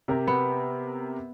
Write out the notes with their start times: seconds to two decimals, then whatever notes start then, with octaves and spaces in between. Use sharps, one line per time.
0.08 C3 G4 A#4
0.27 B3